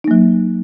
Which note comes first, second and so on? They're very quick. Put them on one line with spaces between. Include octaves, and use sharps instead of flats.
D#4 A#3 F#3